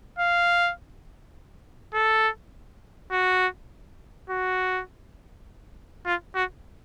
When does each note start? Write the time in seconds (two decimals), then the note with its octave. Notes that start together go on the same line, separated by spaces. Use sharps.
0.18 F5
1.94 A4
3.12 F#4
4.30 F#4
6.06 F4
6.35 F#4